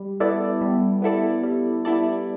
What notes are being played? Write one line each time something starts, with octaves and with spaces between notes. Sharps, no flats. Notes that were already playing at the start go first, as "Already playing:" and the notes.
Already playing: G3
B3 E4 A4 D5
G3
B3 E4 A4 D5
G3
B3 E4 A4 D5